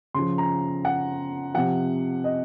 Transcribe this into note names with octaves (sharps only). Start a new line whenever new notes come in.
C#3 F3 C6
A#5
F#5
C3 F3 F#5
D#5